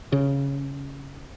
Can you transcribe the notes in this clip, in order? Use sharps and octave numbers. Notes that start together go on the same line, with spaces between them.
C#3